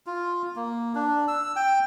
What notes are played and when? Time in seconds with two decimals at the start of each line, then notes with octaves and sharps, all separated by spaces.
0.06 F4
0.56 A#3
0.95 D4
1.28 E6
1.56 G5